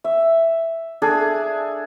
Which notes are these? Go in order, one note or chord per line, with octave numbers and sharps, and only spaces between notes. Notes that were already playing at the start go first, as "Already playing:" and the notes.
E5
D4 G#4 A4